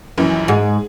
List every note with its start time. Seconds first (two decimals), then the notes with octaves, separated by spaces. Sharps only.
0.18 A#1 F#2 E3
0.48 G#2 G#4